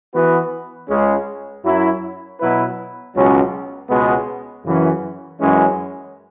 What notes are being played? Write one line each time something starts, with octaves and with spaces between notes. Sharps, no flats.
E3 B3 F#4 B4
C#2 C#3 G#3 C#4 G#4
F#2 F#3 E4
B2 F#3 E4 B4
C#2 B2 F#3 C#4 F#4
C#2 B2 G#3 B3
F#2 C#3 E3 C#4
F#2 E3 G#3 C#4